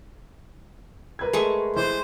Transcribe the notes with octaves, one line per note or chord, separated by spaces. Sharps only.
A#4 B4 G#6
G#3 A3 C#6
E3 C5 D#5